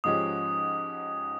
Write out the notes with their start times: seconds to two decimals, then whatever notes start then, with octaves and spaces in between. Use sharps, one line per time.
0.04 G#2 F3 G#3 C#4 G4 D#6